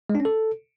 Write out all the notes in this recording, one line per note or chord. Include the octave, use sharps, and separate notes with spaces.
G#3
D4
C#4
A4